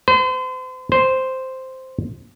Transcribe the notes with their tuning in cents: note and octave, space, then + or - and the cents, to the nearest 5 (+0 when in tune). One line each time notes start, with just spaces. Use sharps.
C5 -40
C5 -5